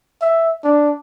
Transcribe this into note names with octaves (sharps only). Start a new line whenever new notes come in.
E5
D4